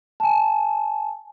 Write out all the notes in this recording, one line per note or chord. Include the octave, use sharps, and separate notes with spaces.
G#5 A5